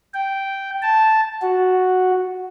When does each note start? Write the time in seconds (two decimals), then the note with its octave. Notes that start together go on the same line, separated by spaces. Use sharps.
0.14 G5
0.82 A5
1.42 F#4